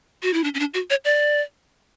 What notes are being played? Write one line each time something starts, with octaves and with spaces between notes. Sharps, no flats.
F#4
E4
D4
C#4
D4
F#4
C#5
D5